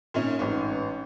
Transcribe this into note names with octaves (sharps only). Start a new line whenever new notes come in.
A#2 C#4 D#4
A1 G#2 C#4